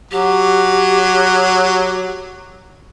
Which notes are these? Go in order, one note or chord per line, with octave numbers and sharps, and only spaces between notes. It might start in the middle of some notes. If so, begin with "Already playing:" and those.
F#3 G4